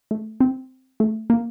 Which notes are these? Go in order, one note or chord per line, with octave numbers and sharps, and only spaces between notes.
A3
C4
A3
A#3